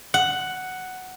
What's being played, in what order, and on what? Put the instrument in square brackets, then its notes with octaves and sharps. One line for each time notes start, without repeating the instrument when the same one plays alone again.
[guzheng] F#5